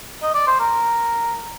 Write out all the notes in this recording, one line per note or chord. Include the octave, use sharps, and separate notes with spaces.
D#5
D5
C5
A#4